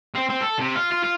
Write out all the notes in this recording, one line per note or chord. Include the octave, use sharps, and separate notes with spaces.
C4
C4
A4
C3
F4
F4
F4